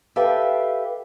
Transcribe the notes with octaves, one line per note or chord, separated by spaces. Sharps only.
G4 A4 B4 E5 F5 G5